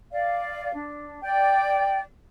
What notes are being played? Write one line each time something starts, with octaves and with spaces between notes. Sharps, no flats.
D5 F5
D4
D5 G5